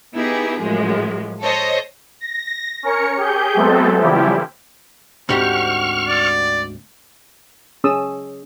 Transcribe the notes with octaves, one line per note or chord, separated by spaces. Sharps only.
B3 D#4 E4 G4 G#4
F#2 A2 F3 G#3
A4 C5 C#5 D#5
A#6
C#4 A#4 C#5 C#7
G4 G#4 G6
F#3 G#3 A3 B3 C4 A4
C#3 E3 F3 G3 E4 G4
D2 G#2 C4 F#4 G4 F#5 C#6 F6
D5
C#4 G#4 D#6 E6